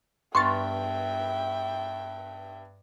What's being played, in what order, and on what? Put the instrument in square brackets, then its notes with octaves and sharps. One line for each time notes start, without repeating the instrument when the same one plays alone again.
[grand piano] G2 B3 F6 [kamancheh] E5 G5 [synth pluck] C6 C#6 A6